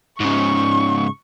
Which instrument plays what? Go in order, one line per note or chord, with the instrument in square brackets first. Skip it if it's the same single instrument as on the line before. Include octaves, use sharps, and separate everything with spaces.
[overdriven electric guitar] G#2 C#3 [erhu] C#6